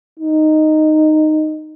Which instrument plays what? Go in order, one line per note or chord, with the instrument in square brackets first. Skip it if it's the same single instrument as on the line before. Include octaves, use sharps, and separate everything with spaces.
[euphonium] D#4